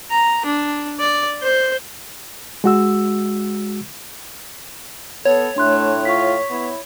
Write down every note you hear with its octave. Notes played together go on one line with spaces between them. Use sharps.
A#5
D4
D5
C5
G#3 F#4 E6
B3 A4 C#5
A2 A3 D4 C6 F#6
F4 C#6 B6
B3 E4